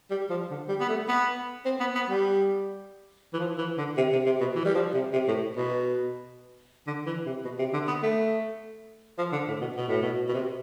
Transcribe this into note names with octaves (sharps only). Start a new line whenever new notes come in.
G3
F3
D3
G3
B3
A3
B3
C4
B3
B3
G3
E3
F3
E3
D3
C3
C3
C3
B2
E3
G3
F3
C3
C3
A2
B2
D3
E3
C3
B2
C3
D3
B3
A3
F3
D3
A2
B2
B2
A2
B2
B2
C3